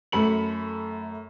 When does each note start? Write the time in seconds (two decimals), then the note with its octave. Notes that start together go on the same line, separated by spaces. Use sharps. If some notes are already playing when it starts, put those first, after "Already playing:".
0.12 F#2 A3 B5 C#7 F#7